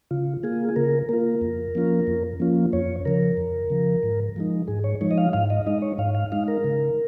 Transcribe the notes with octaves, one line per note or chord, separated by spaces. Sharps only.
C#3 F4
A#3 F4 G#4
G#4
C#3 A#4
A#3 F4 A#4
F2
F3 A#3 C#4 F4
F2
F3 A#3 C#4 F4
F2 C#5
C#3 F3 A#4
F2
C#3 F3
G#2
F3 G#3 D#4
G#2 G#4
C#5
F3 G#3 D#4 C#5
D#5
F5
G#2 F5
D#5
G#3 D#4 D#5
C#5
G#2 F5
F5
G#3 D#4 F5
A#4
C#3